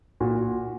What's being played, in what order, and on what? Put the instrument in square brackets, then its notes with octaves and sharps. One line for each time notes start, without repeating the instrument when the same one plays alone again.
[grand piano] A#2 F#4